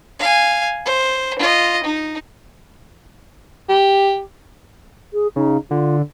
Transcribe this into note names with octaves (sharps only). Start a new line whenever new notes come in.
F5 G#5
C5
F4 D#5
D#4
G4
G#4
C#3 D#4
D3 F4